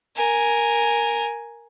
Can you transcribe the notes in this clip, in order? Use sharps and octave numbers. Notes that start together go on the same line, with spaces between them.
A#4 G#5